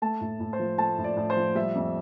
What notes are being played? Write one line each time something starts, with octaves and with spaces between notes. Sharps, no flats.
A3 A5
A2
A2
C5
F3
A3 A5
A2
D5
A2
C5
F3
G3 E5
F2